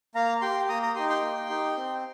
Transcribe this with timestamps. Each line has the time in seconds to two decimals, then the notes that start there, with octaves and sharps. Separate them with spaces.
0.15 A#3 F5 A#5
0.41 G4 G5 C6
0.69 A#3 A#5 D#6
0.82 A#5 D#6
0.95 D#4 G4 G5 C6
1.09 G5 C6
1.22 A#3
1.49 D#4 G4
1.77 C4